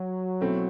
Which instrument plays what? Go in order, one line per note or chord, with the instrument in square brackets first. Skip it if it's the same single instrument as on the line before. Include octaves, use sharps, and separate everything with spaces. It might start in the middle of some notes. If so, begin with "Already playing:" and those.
Already playing: [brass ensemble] F#3
[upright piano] B2 A3 C4 E4